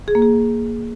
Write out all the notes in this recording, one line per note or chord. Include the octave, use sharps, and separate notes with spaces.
G#4
A#3
G#4